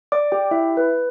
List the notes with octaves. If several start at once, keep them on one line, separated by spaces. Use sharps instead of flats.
D5 D6
G4 G5
E4 E5
B4